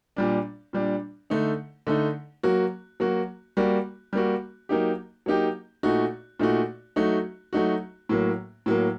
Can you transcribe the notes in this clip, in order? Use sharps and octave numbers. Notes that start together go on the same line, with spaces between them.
A#2 G3 D4
A#2 G3 D4
D3 A3 D#4
D3 A3 D#4
F#3 A#3 F#4
F#3 A#3 F#4
G3 A#3 F#4
G3 A#3 F#4
F#3 A#3 D#4 G4
F#3 A#3 D#4 G4
A#2 A3 D#4 F#4
A#2 A3 D#4 F#4
F#3 A3 D#4 F#4
F#3 A3 D#4 F#4
A2 F#3 A#3
A2 F#3 A#3